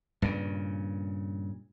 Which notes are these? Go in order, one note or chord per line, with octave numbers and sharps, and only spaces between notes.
G2 A#2 C#3